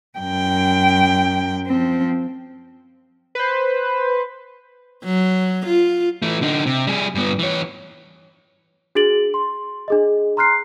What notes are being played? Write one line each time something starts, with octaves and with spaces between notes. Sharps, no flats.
F#2 G5
F3 C4
B4 C5
F#3
F4
E3 A3
D3 D#4
C3
G3 G#4
G2 B3
E3 C#5
D4 F#4 G#4 A6 D7 F#7
C6
D4 G#4 D#5
A#5 C6 F6 F#6 C7